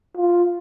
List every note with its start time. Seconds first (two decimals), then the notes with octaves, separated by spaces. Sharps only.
0.17 F4